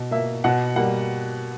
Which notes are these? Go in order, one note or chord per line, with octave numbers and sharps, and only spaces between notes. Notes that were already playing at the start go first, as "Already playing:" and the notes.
Already playing: B2
A#3 E5
B2 F#5
G3 A#3 F#5